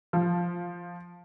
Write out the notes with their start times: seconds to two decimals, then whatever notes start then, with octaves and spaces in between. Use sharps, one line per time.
0.13 F3